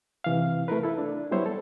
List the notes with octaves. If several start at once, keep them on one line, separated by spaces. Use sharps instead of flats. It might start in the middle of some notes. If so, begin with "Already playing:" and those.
C3 E3 F5
A3 E4 A#4 B4
E4 A4
D4
F#3 G3 B3 E4 C5 C#5
A4